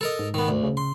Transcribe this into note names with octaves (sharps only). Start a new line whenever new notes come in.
A4 A#4 D#5
G#2
D#3 B3
D2
C#3
C6